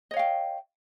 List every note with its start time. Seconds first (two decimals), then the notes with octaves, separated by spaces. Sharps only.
0.11 D#5
0.14 C#5
0.16 F5
0.19 G5